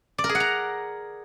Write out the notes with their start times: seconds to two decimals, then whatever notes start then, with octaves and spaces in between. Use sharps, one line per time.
0.18 D5
0.24 A#4
0.29 G#4
0.35 F#5
0.40 A#5